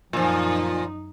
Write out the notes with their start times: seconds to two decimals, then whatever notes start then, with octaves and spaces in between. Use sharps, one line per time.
0.13 F#2 A#2 F3 D#4